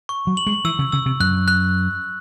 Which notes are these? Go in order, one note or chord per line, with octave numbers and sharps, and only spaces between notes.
C#6
F#3
F#7
G#3
E3 E6
C#3
C#3 E6
C3
F#2 F#6
F#6